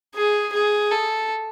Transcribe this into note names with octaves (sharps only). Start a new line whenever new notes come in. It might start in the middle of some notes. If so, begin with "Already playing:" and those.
G#4
G#4
A4